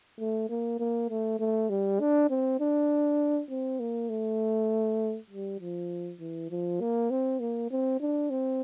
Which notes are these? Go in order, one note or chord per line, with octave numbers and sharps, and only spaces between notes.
A3
A#3
A#3
A3
A3
G3
D4
C4
D4
C4
A#3
A3
G3
F3
E3
F3
A#3
C4
A#3
C4
D4
C4